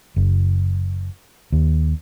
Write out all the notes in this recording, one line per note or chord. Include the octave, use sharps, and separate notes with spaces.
F#1
D#2